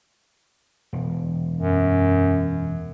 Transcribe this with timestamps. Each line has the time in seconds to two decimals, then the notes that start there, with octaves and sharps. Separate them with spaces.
0.93 E1
1.57 F#2